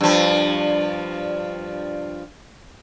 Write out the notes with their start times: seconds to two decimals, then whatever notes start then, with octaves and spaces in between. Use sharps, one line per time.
0.01 G2 F3